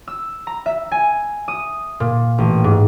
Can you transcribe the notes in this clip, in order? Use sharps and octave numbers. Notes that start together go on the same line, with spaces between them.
E6
A#5
E5
G#5
D#6
A#2
A1
G#2